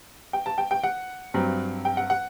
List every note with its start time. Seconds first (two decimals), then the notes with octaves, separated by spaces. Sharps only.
0.33 G5
0.46 A5
0.58 G5
0.71 G5
0.84 F#5
1.34 G2 F#3 C4
1.85 G5
1.97 F#5
2.10 F#5